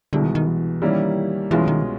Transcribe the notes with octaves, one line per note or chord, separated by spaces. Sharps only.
C2 B2 D3 G#3
D#3
D#3
E3
D#3 G3 A#3 C#4 E4
C2 B2 E3 G#3 C#4 F4
D#3